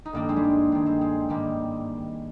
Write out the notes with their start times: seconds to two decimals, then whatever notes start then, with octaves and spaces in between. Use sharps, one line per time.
0.05 D#4
0.13 G2 D#3 A#3 D4
0.29 G#3 C4
0.36 G3
0.44 G#3
0.72 G2 D#3 G#3
0.86 G#3 C4
1.01 G#3 C4
1.29 G#2 D#3 G3 A#3